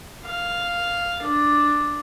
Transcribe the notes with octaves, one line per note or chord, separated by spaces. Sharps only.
F5
D4